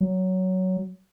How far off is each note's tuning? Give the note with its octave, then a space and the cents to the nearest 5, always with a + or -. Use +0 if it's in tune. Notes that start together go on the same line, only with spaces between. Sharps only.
F#3 +10